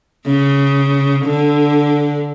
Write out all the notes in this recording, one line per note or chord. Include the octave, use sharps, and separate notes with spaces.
C#3
D3